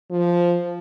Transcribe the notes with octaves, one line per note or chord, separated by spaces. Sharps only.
F3